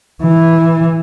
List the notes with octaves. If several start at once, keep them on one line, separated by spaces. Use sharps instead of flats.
E3